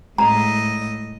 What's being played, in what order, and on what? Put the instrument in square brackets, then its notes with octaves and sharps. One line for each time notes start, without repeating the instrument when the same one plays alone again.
[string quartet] A2 D#5 [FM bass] G#3 [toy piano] A#5